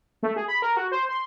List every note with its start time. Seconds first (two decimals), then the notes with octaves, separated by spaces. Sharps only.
0.23 A3
0.36 G#4
0.48 B5
0.62 A#4
0.77 F#4
0.92 C5
1.09 C6